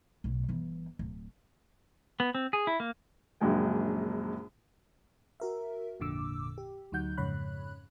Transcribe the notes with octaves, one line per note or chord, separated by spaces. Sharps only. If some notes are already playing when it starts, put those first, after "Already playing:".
B1 A2
G1 E3
D1
B3
C4
G#4
E4
A#3
A#1 F#2 C#3 G#3 D4 G5
F#4 A#4 E5
G#1 F2 A#2 D3 D6 E6
G4
D2 F#3 D#4 F#5 G6
F2 G#2 C#3 C#5 B5 F#6